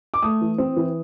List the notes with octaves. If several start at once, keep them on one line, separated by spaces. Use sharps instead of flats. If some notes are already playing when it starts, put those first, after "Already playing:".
D6
A3 D#6
E3
C4
E3